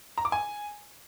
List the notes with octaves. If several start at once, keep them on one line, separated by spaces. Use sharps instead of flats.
A#5
D6
G#5